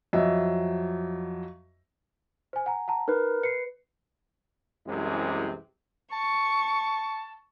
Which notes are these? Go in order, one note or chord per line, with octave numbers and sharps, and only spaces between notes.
F2 F#3 D#5 E5
C5 G#5
F#5 G#5 A#5
F#5 A5 A#5
D#4 A#4 B4
B4 C7 C#7
C2 F#2 C3 E3 G#3
A5 C#6